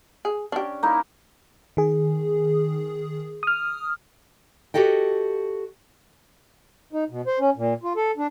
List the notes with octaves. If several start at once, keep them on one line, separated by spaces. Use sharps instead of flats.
G#4
C#4 D4 G4
A#3 D#4 E4
D#3 G#4
D#6 F6
F#4 G4 A4 D#5 G5
D#4
B2
C5
C#4
A#2
F4
A4
D4